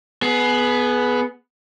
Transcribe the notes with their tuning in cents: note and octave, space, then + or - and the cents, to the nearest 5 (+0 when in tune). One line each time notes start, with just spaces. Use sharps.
B3 +0 G#4 +25